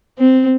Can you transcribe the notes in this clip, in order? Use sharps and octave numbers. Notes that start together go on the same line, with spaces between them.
C4